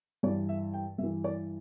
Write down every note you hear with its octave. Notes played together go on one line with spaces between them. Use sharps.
G2 E3 D5
E5
G5
G2 E3 E5
D5